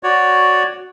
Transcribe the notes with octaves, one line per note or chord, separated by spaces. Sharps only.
F#4 C#5 D5